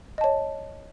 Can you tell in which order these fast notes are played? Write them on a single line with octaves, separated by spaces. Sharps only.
D#5 A5 C#5